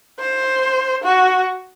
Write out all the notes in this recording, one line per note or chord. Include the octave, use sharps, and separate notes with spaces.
C5
F#4